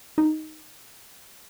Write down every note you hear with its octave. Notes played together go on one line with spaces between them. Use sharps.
D#4